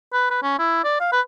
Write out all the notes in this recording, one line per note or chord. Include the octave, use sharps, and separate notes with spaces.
B4
B4
C#4
E4
D5
F5
B4